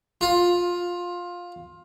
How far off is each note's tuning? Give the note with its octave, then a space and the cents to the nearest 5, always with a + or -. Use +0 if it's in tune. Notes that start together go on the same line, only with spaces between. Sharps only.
F4 +15